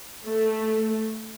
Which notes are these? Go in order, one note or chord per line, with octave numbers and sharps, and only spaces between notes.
A3